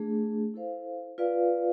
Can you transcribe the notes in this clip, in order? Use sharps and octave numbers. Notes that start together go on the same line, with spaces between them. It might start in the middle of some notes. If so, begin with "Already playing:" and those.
Already playing: A3 D4 G#4
E4 A4 C5 F5
F4 B4 D5 F5